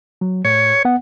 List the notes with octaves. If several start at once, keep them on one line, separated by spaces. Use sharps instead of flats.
F#3
A2 C#5
B3 F#5